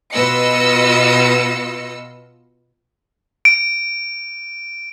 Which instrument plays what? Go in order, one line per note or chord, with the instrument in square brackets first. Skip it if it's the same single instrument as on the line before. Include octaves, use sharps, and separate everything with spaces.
[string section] B2 F4 B4 D#5 E6 C#7
[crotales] D7